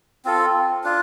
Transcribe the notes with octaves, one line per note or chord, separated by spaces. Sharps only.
C4 F4 A4
D4 F4